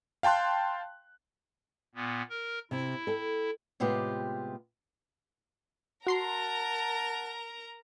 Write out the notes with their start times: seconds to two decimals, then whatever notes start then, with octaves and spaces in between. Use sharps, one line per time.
0.23 F5 G5 A5 C6 F#6
1.95 A#2 B3
2.30 A#4
2.71 C3 E4
3.07 A4 G5
3.80 A2 C3 G#3 B3 F4 G4
6.07 F#4 A#4 F#5 A5 A#5 C6 C7